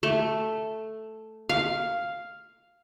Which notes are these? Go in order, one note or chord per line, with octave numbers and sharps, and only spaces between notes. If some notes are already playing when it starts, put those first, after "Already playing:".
A3
F5